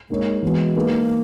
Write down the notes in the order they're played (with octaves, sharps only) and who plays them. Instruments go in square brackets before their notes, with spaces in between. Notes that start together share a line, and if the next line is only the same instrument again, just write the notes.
[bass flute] G#3 [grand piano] A#3 D#4 A#4 C#5
[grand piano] E3 B3 F#4 [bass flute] G#3
[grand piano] G#3 D#4 G#4 B4 [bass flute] A#3